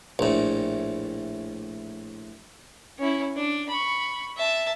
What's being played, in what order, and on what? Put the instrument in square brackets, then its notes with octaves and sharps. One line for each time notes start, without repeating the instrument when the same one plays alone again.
[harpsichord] A#1 A2
[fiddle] C#4 E4
D4
B5 C#6
E5 A5